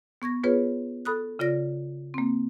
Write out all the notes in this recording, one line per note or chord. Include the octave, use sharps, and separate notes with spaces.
B3 C#6 G#6 A#6
B3 F4 G#4 B4 C#5
A4 B5 D#6 F#6
C#3 F4 D5 A#6
A#3 C4